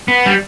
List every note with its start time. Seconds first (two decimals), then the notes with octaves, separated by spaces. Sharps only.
0.08 B3
0.26 G3